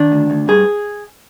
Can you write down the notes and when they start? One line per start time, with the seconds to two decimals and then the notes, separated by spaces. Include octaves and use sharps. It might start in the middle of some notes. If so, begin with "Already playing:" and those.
Already playing: D#3 D4
0.12 D2
0.30 D2
0.48 G2 G#4